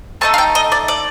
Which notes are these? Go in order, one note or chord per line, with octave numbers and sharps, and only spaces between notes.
A3 D#4 A4 A5
F5
G5
D#5
D5
D5